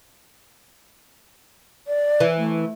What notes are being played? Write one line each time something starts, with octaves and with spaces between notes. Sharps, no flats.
D5
E3
A3